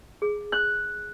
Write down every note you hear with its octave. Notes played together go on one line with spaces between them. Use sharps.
G#4
F#6